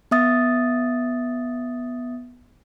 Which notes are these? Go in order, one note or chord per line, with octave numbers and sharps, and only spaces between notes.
B3 E5 D#6 A6